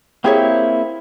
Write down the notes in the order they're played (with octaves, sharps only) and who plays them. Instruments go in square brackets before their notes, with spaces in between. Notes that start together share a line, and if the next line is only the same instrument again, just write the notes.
[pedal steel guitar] A#3 C4 E4 [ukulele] G4 G#4 C#5